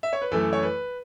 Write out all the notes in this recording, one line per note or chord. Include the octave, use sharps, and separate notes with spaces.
E5
C#5
B4
F#2 E3 A3 A4
C#5
B4